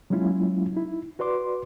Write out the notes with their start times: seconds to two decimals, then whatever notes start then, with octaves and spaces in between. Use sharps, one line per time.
0.10 F#3 G#3 A#3 C#4 E4 F4
0.73 D#4 E4
1.19 F#4 B4 D5 C6 D6